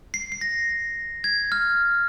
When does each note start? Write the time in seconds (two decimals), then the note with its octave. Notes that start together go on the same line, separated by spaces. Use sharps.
0.14 C7
0.32 C7
0.41 A#6
1.24 G#6
1.52 F6